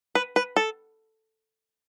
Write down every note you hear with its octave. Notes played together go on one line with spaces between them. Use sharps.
B4
B4
A4